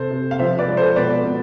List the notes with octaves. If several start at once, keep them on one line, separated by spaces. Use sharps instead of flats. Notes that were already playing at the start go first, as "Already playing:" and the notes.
Already playing: C3 A4 C5
C3
F5
F3 C5 E5
B4 D5
G#3
A4 C5
B2 B4 D5
B2